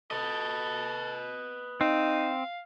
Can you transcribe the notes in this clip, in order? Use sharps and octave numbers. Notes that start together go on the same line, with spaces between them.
A4 B4 D#5
C4 D#4 F5